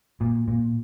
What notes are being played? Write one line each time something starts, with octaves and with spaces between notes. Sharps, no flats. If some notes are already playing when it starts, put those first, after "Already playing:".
A#2
A#2